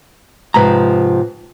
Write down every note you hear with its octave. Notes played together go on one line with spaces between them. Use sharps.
G#2 C3 F3 B4 A#5